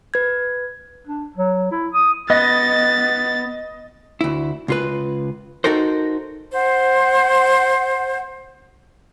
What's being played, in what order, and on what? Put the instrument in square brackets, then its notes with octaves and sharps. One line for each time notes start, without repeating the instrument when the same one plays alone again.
[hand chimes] B4 G#6
[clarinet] D4
F#3
E4
D#6
[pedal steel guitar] B3 [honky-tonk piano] D#5 [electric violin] A6
[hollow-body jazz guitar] D2 E4
C#2 F4 B4
D#4 F#4 A4 A#4 C5
[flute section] C5 F#5